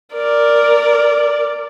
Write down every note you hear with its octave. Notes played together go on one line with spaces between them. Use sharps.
A#4 D5